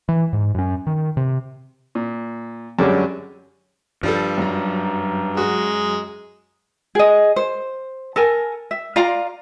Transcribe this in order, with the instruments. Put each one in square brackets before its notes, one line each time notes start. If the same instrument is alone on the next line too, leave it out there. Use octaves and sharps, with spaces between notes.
[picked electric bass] E3
G#2
F#2 C#4
D#3
C3
[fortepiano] A#2
F#2 D3 G3 G#3 C#4
[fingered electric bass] G2 [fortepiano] F3 G3 A4
[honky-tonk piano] F#2 A#5
[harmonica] G#3 [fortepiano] F#4
[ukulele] G#4 D#5
C5
A4 A#4 G#5
E5
F4 D5 F5 A#5